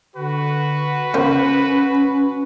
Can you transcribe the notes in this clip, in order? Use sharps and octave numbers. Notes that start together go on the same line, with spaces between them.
D3 F#4 B4
C#2 C#4 A#4 C5